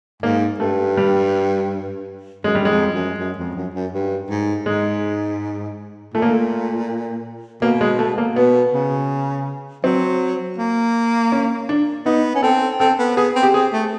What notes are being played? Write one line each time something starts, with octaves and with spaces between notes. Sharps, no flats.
G#2 A#3
G2 A3
G3
F#2 G#3
F#2 G3
F2 G#3
F#2
F#2
F2
F#2
F#2
G2
G#2
G#2 G#3
A#2 A3
A#3
A3
B2 A#3
G#3
A3
A#3
B2 B3
C#3
F#3 C4
A#3
C#4
D4
B3 D#4
C#4
C4 A4
C4 A4
B3
B3 G#4
C4
G4
C4 G#4
A3